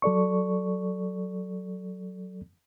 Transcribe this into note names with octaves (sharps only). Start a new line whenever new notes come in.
F#3 A4 D5 C#6